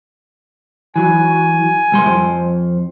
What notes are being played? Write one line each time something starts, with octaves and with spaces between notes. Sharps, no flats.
E3 F#3 G#5
B1 G3 C6
F2 F3